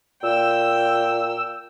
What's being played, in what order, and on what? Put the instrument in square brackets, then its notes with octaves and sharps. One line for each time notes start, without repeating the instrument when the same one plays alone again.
[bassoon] A#2 [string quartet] G5 [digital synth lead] E6